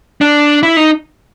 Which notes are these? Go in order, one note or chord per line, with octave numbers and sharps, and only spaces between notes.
D4
E4
D#4